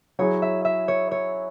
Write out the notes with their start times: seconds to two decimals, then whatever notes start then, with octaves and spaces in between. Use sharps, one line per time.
0.19 F#3 E4 G#4 C#5
0.42 E5
0.65 E5
0.88 C#5
1.11 C#5